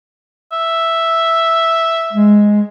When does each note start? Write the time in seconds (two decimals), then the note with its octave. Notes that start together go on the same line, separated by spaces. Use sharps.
0.52 E5
2.13 G#3